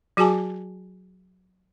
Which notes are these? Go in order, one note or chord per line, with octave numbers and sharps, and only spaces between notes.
F#3 F#4 G#4 G#5 A5 D6